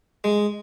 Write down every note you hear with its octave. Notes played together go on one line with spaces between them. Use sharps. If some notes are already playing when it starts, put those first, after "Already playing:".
G#3